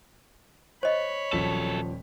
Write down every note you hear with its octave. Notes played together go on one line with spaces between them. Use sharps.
C5 C#5 D#5 B5
D#1 F3 F#3 A4 B6